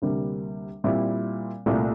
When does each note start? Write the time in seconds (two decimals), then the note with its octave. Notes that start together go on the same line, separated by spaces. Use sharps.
0.02 D2 C3 G3 A#3
0.84 A#2 G3 C4 E4
1.66 C2 A#2 A3 C4